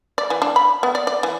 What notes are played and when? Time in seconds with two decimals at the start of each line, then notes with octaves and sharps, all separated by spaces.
0.18 D5
0.30 E3
0.42 D4
0.56 B5
0.83 B3
0.95 D5
1.07 D5
1.23 E3